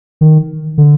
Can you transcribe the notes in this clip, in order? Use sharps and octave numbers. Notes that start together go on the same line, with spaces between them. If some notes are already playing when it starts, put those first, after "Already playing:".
D#3
D3